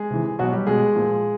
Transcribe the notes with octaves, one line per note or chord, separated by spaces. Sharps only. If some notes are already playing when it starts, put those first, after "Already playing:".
Already playing: G#3 G#4
C3 E3
B2 F#3 F#4
G3 G4
B2 G#3 G#4
A#2 F3